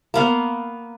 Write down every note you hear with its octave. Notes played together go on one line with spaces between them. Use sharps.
A#3 B3 F5